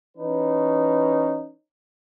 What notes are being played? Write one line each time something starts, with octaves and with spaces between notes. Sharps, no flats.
E3 C#4 D#4 B4